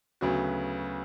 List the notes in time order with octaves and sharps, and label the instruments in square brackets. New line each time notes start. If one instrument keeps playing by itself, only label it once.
[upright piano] D2 C#3 F#3 B3 F#4